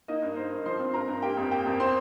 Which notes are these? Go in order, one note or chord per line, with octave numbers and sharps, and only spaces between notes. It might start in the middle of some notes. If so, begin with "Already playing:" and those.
A#3 D#4 D#5
G2
A#3 C5
G2
F3 C5 C6
C4
G2 A#4 A#5
G2
A#3 G4 G5
F2
A#3 G4 G5
F2
C4 C5 C6